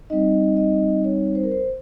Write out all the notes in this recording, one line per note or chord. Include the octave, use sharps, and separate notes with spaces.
G3 C4 D#4 D#5
D#5
C#5
C5
A#4
C5